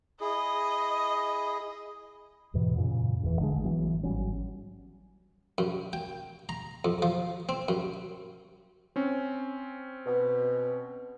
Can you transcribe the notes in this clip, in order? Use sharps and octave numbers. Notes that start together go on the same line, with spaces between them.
E4 G#4 D#5
D#2 G#2 B2 E3
F#2 A#2 C#3
F#1 E2 C#3 E3
A1 D3 F3 G#3
A1 E3 F#3 B3
G#1 F#3 G3 C#4
F#2
G5
A#5
F2
F3
C4
F#2
C4 C#4
B2